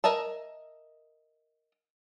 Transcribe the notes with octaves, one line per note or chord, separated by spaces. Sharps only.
A#4 D#5 E5 A5